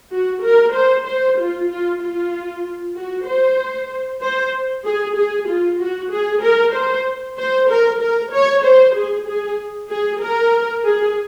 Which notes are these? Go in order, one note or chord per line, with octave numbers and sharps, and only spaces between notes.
F#4
A#4
C5
C5
F4
F4
F4
F#4
C5
C5
G#4
G#4
F4
F#4
G#4
A#4
C5
C5
A#4
A#4
C#5
C5
G#4
G#4
G#4
A#4
G#4